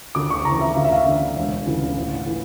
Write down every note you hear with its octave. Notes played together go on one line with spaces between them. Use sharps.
D2 D6
C#6
C#3 E3 A#5
E5
D2 F5
E5
F5
D3
E1
D2 C#3 E3
A1
E3